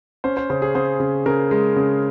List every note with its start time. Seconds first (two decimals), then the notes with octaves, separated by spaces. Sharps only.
0.24 C#4 C5
0.37 C5
0.50 C#3 C5
0.62 G#4
0.75 C#3 C5
1.00 C#3
1.26 C#3 A#4
1.51 G#3
1.76 C#3